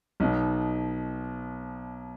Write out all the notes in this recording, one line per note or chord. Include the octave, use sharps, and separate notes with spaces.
B1 B2 D#4